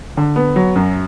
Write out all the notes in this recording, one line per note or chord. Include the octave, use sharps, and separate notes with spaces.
D3
B3
F#3
F#2